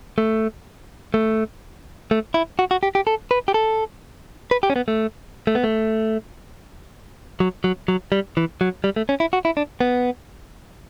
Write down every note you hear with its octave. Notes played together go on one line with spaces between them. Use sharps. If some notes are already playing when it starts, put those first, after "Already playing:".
A3
A3
A3
E4
F#4
F#4
G4
G4
A4
B4
G4
A4
B4
G4
C#4
B3
A3
A3
B3
A3
F#3
F#3
F#3
G3
E3
F#3
G3
A3
C#4
E4
F#4
E4
D4
B3